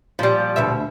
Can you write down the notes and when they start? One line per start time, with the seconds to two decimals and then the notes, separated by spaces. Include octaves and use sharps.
0.19 A#2 F3 G3
0.56 D2 B2 E5